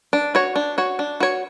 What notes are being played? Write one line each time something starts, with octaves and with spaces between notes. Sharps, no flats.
D4
F#4 C#5
D4
F#4 C#5
D4
F#4 C#5